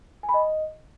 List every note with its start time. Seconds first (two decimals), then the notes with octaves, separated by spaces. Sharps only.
0.23 G#5
0.29 B5
0.34 D#5